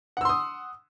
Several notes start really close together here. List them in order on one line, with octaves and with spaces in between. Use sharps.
F#5 E6 C6 D#6